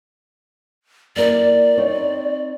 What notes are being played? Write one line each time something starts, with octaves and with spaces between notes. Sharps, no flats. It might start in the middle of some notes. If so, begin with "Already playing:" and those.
A#3 E4 A#4 D5
C4 D#4 C#5